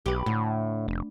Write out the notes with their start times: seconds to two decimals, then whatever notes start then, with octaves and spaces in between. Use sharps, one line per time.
0.06 B1 G4 B4
0.26 D2 A2
0.88 F1